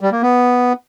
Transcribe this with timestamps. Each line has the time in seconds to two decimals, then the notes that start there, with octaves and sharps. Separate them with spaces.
0.01 G3
0.12 A#3
0.23 B3